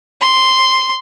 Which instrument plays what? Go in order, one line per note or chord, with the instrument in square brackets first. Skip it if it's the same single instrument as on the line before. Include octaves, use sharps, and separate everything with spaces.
[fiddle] C6